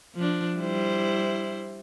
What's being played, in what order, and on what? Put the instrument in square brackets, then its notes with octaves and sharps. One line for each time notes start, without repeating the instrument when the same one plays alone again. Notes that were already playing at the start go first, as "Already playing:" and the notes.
[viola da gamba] F3 D4
G3 E4 C5